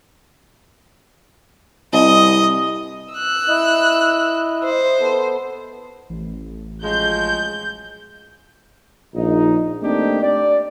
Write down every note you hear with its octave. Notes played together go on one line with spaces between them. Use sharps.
C2 D#5
E6 F#6
E4 D#5
C5
B3 A4
A1
F3 F#3 G#3 G6
A#1 D#4
A3 A#3 C4 D4 D#4 G4
D5